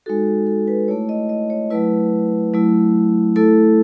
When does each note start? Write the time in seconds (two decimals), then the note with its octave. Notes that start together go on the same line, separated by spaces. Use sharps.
0.06 G#3 D#4 F#4 A4
0.47 A4
0.68 B4
0.88 A3 E4 C#5
1.09 D#5
1.29 D#5
1.50 C#5
1.71 F#3 A3 E4 B4
2.53 F#3 A3 E4
3.36 A3 E4 A4